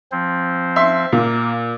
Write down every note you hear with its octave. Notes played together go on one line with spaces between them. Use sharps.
F3 C4 C5
E5 C6
A#2 A#3